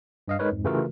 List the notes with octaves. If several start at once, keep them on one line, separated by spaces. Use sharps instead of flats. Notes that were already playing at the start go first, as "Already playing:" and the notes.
G2 D#5 F5
G#3 D#4 A#4 B4 C#5
F2 G#2
C#3 E3 A3 F4 F#4 A#4